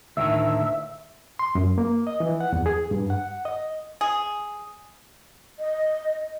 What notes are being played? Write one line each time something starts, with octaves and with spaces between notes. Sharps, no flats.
D2 A2 D#3 E5
C6
F#2
A#3
D#5
E3
F#5
E2
G#4
G2
F#5
D#5
G#4
D#5